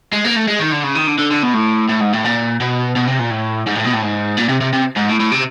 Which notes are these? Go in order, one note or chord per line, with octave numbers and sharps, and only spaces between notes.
G#3
A#3
A3
G#3
D#3
D3
C#3
D#3
D3
D3
D3
B2
A2
A2
G#2
A2
A#2
B2
B2
C3
A#2
A2
G#2
A2
B2
A2
G#2
A#2
C3
C3
C3
G#2
A2
A2
C3